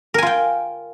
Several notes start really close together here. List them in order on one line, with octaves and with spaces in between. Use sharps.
A#4 G#5 F4 G5